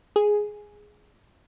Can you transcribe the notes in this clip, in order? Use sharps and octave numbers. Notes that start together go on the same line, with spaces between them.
G#4